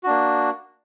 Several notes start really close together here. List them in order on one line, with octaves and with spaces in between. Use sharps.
F#4 D4 A#3